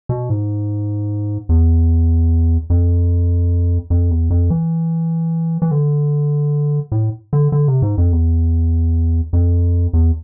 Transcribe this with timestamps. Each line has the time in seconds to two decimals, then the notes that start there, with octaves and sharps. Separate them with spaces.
0.09 B2
0.29 G#2
1.49 E2
2.70 F2
3.90 F2
4.11 E2
4.30 F2
4.50 E3
5.62 E3
5.71 D3
6.92 A2
7.33 D3
7.52 D3
7.68 C3
7.82 G#2
7.98 F2
8.13 E2
9.33 F2
9.93 E2